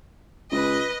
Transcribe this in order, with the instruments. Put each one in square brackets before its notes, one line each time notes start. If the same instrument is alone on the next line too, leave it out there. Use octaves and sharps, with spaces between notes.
[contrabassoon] C#2 [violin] B4 D#5